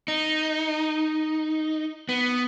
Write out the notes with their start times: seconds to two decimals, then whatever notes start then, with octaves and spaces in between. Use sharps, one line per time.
0.08 D#4
2.09 B3